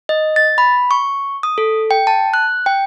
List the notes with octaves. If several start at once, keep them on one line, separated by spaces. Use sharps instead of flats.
D#5
A6
B5
C#6
D#6
A4
G5
A5
F#6
G5